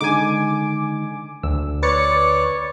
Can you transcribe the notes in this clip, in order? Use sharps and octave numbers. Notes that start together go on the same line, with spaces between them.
D3 G#3 D#4 G#5 D6
D2 E6
B4 C#5 D5 A6 C#7